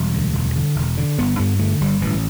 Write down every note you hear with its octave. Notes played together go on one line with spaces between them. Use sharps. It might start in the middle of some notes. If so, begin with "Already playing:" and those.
Already playing: E1 G3
D2
E1
D3
E1
D3
G1 B3
G2 B3
D3 A3
G1 G3
A1 E3